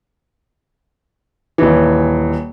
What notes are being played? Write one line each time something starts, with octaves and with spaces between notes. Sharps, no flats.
D#1 E3